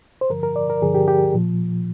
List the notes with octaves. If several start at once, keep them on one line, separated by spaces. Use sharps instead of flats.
C5
G2 D3 F3 A#4
A#4
D5
A#4
G2 D3 F3 G#4
G4
G4
A#2 F3